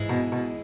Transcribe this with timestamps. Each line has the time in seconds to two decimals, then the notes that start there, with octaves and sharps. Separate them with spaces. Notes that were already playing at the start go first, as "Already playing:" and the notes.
Already playing: G#2 E3 G#3 E4 G#4
0.09 B2
0.32 B2